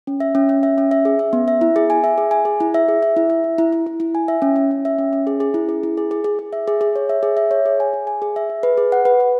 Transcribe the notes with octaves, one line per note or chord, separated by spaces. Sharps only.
C#4
E5
C#4
C#4
E5
C#4
E5
G#4
E5
B3
E5
E4
G#4
G#5
E5
G#4
G#5
G#4
E4
E5
G#4
E5
E4
E5
E4
E4
E4
E4
E4
G#5
E5
C#4
C#4
C#4
E5
C#4
C#4
G#4
G#4
E4
G#4
E4
G#4
G#4
G#4
G#4
E5
G#4
G#4
C#5
E5
G#4
E5
C#5
G#4
G#5
G#4
G#5
G#4
E5
G#4
B4
G#4
F#5
B4
B4